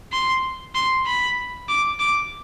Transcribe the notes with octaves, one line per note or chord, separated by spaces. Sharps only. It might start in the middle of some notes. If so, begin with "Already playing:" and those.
C6
C6
B5
D6
D6